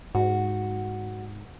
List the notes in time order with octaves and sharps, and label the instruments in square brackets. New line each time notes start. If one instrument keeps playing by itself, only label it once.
[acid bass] G#2 [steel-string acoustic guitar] F#4